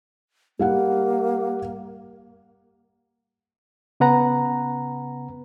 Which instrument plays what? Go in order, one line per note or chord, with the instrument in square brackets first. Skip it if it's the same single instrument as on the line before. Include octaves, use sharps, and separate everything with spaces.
[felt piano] G3 F5 F#5 [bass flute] A#3
[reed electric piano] C#3 B3 B4 F#5 A#5